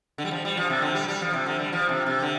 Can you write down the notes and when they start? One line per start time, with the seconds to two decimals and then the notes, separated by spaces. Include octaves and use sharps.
0.18 D3
0.25 G3
0.31 F3
0.45 G3
0.57 F3
0.70 C3
0.82 D3
0.95 G3
1.08 G3
1.21 F3
1.33 C3
1.46 D3
1.59 G3
1.73 F3
1.89 C3
2.06 C3
2.22 D3